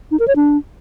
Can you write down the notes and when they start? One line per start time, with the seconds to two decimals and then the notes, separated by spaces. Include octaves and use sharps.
0.11 D#4
0.20 A#4
0.28 C#5
0.36 D4